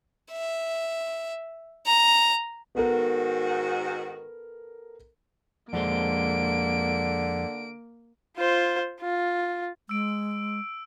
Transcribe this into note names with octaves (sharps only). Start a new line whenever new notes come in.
E5
A#5
G#2 D#3 B3 F#4 A4 A#4
F2 D3 G#3 A#3 C5 D7
F4 C5
F4
G#3 E6 D7